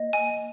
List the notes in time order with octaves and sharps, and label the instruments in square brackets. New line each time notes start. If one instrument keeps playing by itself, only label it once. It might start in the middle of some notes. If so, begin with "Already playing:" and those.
Already playing: [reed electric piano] A#3 [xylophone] D#5
[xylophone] G#5